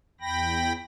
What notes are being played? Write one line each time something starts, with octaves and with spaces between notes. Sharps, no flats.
E2 G5 B5 A#6